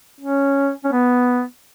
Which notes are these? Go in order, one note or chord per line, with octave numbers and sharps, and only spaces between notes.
C#4
C#4
B3